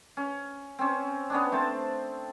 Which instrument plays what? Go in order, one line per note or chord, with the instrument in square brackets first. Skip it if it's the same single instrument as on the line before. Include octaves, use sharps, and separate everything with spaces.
[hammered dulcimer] C#4
C4 C#4
B3 C#4 D4
A3 C4 C5 A5